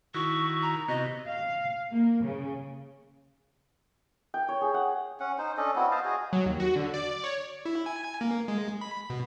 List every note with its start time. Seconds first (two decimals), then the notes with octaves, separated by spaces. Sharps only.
0.14 D#3 E4 F#4 C#6
0.62 A#5
0.88 C3 B3 F#4 D#5
1.28 F5
1.92 A#3
2.24 C#3
4.34 G5
4.48 C#5
4.61 G#4
4.74 F#5
5.20 C#4 F#5
5.38 D#4 C5
5.57 C#4 D4 A4 D#5
5.76 B3 C4 E4 F#4
5.91 C5 D#5 F5 A5
6.05 F#4 G#4 D#5
6.33 F#3
6.46 D#2
6.60 F#4
6.76 D3
6.94 D5
7.11 D5
7.24 C#5
7.66 E4
7.86 G#5
8.04 G#5
8.21 A#3
8.48 G#3
8.81 B5
9.10 B2